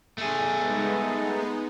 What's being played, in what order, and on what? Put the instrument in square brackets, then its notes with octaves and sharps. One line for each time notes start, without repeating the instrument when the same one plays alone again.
[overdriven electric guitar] A3 G#4
[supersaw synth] G#3 B3 D#4